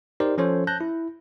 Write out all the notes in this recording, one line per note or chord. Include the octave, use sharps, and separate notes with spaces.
D#4 G4 A#4 C5 D5
F3 C#4 A4 C5 C#5
A5 F#6 G6 A#6
E4